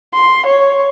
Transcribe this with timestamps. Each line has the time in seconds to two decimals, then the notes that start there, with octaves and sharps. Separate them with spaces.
0.14 C6
0.46 C#5